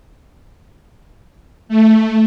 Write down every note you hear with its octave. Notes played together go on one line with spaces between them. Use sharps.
A3